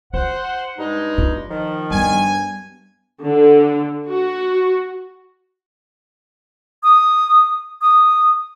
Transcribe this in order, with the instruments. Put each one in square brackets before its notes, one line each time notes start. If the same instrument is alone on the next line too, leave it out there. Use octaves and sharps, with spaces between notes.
[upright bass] F4 [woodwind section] C5 F#5
[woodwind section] G2 G#3 D#4
[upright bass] F4
[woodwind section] D#3 F3
[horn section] G2 G#5 [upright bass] G3 B3
[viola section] D3
F#4
[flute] D#6
D#6